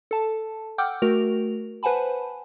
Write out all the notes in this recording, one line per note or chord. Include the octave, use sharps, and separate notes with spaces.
A4 A5
F#5 G5 D6 E6 F6 G6
A3 F#4 A#4 F7
B4 C5 F#5 G#5 A5 B5